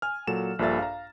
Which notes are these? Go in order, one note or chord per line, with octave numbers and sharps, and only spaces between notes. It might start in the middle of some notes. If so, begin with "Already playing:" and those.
G#5 F6
A#2 F#3 A4 E7
A#1 G2 A#2 A4 E5 A6
F5 A#5